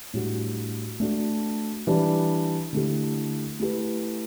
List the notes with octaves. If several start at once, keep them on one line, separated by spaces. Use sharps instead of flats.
A2 G3 D4 F#4
A3 D4 F#4
E3 G3 D4
D3 A3 E4 G4
A3 E4 G4 B4